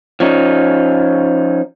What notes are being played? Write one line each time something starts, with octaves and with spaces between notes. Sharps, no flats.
F3 C#4 D#4